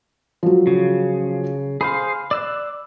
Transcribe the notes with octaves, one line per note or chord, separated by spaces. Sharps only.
F3 F#3
C#3
G#4 C5 F5 B5
D5 E6 F#6